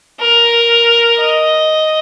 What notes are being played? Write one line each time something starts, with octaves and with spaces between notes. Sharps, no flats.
A#4
D#5